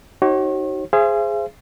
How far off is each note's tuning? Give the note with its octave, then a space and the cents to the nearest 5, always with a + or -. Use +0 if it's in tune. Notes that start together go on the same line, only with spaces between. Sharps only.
D#4 +5 F#4 +40 C#5 -40
G#4 +0 C5 +0 F5 -45